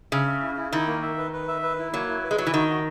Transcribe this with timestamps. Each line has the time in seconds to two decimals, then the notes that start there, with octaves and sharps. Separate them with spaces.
0.12 C#3 E5
0.26 E5
0.42 E4
0.57 E4
0.72 D#3 E4
0.87 A#3
1.02 E5
1.18 B4
1.33 B4
1.48 E5
1.63 B4
1.79 E4
1.93 F#3 A#3
2.09 E4
2.24 B4
2.31 G#3
2.38 F#3 E4
2.47 E3
2.54 D#3 F#4
2.69 F#4